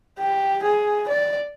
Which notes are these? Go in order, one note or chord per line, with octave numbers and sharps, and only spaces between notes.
G4
G#4
D5